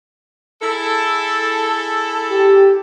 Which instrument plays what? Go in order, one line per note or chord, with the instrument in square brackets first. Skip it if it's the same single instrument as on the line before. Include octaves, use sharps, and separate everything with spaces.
[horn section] E4 G#4 A4
[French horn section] G4